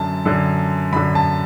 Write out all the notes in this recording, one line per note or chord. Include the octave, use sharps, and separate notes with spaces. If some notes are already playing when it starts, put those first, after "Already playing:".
Already playing: F#2 D3 A5
F#2 D3
F#2 D3 B5
A5